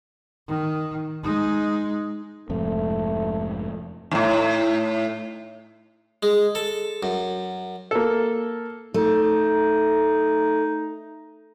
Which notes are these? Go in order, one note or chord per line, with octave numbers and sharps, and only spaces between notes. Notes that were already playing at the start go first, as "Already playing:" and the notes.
D#3
G#3 D#4
F1 F2 G#2 A3
D#2 A2
G#3
A4
F#2
A#3 A4
A3 D#4